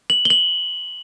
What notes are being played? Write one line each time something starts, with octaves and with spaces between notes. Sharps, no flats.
F#7
G7
F#7